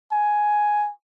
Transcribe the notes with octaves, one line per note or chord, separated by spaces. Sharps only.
G#5